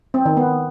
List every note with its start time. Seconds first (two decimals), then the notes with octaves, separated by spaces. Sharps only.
0.14 C4
0.25 D#3
0.37 B3